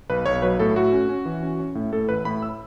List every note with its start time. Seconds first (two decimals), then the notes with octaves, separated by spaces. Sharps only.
0.10 B1 B4
0.26 B1 C#5
0.42 F#3 B4
0.59 A2 A4
0.76 A3 F#4
0.92 C#4
1.09 C#4
1.26 E3
1.43 C#4
1.60 C#4
1.75 A2
1.92 A2 A4
2.09 A1 B4
2.25 A2 B5
2.42 E6